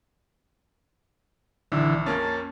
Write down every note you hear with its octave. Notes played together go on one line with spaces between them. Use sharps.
A#1 D3 E3
F2 A#3 C#4 A5